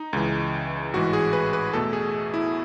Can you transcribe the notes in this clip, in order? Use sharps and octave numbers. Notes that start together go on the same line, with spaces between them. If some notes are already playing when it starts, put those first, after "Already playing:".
Already playing: D#4
C#2 C#3 E3
A1 G#2 E3 F#4
G#4
B4
B4
E2 B2 A3 A4
G#4
E4